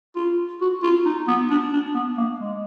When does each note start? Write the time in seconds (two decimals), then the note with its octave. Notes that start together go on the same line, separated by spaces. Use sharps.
0.16 F4
0.61 F#4
0.83 F4
1.05 D#4
1.28 B3
1.50 D4
1.73 D4
1.95 B3
2.17 A#3
2.40 G#3